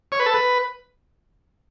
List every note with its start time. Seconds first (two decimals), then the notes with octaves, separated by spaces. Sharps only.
0.12 C#5
0.20 B4
0.26 A4
0.34 B4